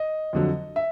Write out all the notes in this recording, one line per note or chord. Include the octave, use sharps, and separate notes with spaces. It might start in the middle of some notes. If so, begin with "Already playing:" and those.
Already playing: D#5
F2 D3 F#3
E5